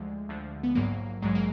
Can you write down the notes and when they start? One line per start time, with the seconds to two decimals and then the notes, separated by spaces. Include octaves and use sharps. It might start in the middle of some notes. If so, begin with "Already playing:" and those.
Already playing: D2 D3 F3 G#3
0.29 D2 D3 F3
0.63 B3
0.75 A#1 G#2 F#3 A#3
1.22 A#1 G#2 F#3 G#3
1.35 A#3